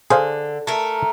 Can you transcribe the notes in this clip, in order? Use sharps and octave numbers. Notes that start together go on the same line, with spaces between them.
D3 G#4 C5 F5
A3 A#4